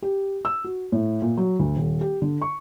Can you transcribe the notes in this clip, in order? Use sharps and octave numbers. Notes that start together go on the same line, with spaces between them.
G4
E6
F#4
A2
A#2
F#3
D2
D#1
G4
D3
C#6